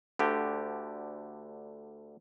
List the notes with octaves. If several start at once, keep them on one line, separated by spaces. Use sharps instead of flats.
D2 D3 G4